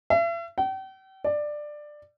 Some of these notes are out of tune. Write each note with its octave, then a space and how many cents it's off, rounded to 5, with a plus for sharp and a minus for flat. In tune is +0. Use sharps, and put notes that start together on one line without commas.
E5 +40
G5 -40
D5 +15